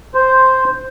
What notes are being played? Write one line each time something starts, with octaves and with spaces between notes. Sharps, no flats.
C5